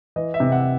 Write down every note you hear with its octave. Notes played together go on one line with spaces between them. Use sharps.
E3 D#5
E5
C3
F#5